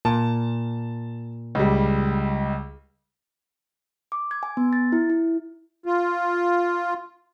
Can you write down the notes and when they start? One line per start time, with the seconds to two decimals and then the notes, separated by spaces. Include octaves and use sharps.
0.05 A#2 A5
1.55 C#2 G3
4.12 D6
4.31 G#6
4.43 G#5
4.57 B3
4.73 A6
4.92 E4
5.10 E4
5.86 F4